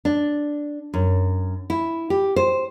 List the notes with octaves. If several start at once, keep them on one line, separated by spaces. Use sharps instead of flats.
D4
F#2
E4
G4
C5